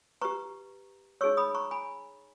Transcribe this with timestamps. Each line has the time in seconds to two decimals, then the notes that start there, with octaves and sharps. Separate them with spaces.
0.22 G4 B4 A#5 C#6
1.21 D#4 G#4 C#5 C#6 E6
1.37 B5 D#6
1.55 A#5 C#6
1.71 G#5 B5